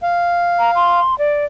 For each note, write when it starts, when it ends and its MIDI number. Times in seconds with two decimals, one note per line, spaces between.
0.03 1.00 77
0.59 0.71 82
0.75 1.17 84
1.18 1.45 74